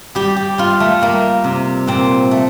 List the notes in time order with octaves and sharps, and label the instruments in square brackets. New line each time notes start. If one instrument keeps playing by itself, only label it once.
[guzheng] G3 G4
G4
G3 F4
A3
G3 A#3
C3
A#2 C4
A3